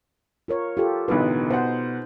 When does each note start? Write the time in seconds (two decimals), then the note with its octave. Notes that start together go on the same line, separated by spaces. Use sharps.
0.48 F4 A#4 C#5
0.77 F4 G4 A4
1.08 A1 B2 D3 B3 D#4 B4
1.50 B2 C5 F#5